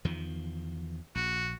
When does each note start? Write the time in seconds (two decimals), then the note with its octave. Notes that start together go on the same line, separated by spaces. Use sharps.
0.05 E2 D#3 F3
1.15 A#1 F#4